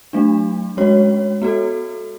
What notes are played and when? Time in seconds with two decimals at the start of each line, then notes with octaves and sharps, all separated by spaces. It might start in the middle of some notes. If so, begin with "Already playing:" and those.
0.13 F#3 A3 D4
0.77 G#3 C#4 F#4 C#5
1.42 B3 F#4 A4